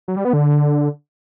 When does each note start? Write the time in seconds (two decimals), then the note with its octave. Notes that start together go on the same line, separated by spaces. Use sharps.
0.08 F#3
0.16 G3
0.25 B3
0.33 D3